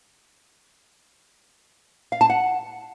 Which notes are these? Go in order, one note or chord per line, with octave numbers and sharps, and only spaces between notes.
F5
A5
F#5